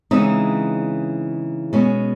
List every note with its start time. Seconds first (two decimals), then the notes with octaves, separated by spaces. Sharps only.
0.11 C#3 E3 G#3 C4 D#4
1.73 B2 G#3 C#4